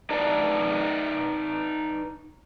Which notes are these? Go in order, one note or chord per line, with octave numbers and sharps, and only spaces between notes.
D#4 B4 D5 D#5 A5